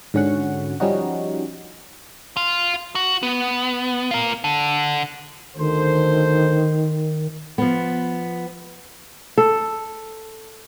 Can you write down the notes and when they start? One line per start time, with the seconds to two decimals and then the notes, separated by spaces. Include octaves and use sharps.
0.14 G#2 D3 C#4 F#4 F#5
0.80 F3 G3 C#4 D#4 F#4
2.37 F5 C6
2.95 F#4
3.23 B3
4.11 F4 A#4
4.44 D3
5.57 D2 D#3 A4 C5
7.58 F3 B3
9.38 A4